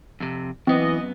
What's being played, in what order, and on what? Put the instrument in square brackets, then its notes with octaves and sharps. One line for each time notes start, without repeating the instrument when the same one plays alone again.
[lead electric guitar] F2 C3
[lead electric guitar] F#2 B3 [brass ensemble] E3 D#5 [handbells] C4